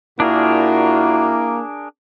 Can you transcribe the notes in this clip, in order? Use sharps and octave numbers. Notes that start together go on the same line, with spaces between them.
A#2 A#3 D4 E4 F#4 G#4 A#4